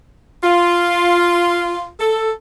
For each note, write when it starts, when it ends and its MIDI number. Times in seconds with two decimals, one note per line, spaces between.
0.43 1.85 65
1.99 2.30 69